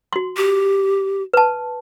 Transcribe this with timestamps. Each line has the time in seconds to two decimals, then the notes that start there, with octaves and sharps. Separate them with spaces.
0.13 F#4 C6
0.37 G4
1.33 B4 A5